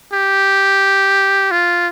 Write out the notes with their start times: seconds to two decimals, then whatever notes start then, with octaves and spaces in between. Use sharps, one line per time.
0.13 G4
1.51 F4